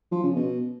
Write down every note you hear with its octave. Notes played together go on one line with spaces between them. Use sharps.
F3
C#3
B2